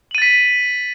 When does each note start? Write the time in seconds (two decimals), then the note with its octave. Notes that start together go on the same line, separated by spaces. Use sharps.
0.11 F#7
0.15 D#7
0.18 A6
0.22 B6